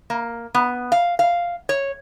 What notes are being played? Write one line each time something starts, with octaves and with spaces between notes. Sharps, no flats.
A#3
B3
F5
F5
C#5